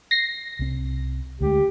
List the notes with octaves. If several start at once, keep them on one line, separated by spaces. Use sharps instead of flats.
A#6 C7
C2 C4
D2 G#3 G4